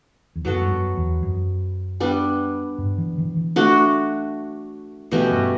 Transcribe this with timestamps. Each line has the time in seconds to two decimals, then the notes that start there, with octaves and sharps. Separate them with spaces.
0.36 E2
0.45 F#2 F#3 B3 F#4 A4
0.61 G2
0.71 F#2
0.97 E2
1.23 F#2
2.00 G3 B3 D4
2.78 G2
2.98 E3
3.18 E3
3.37 E3
3.56 A3 D4 F#4
5.11 B2 E3 A3 C#4 G4
5.32 G2